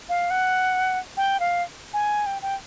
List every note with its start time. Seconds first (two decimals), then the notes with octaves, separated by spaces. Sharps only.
0.09 F5
0.30 F#5
1.17 G5
1.40 F5
1.93 G#5
2.26 G5
2.42 G5